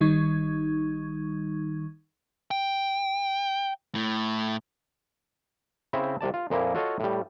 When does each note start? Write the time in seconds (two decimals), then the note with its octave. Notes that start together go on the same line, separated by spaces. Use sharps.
0.01 G1 D#3 G3 D#4 C#6 G#6
2.51 G5
3.95 A2
5.93 C#3 C4 E4 C5 E5
6.21 C2 C3 D5 A5
6.34 F4
6.50 F2 A#2 F3 A#3 E4
6.74 F4 F#4 A4 C#5 D#5 F5
7.00 A2 G3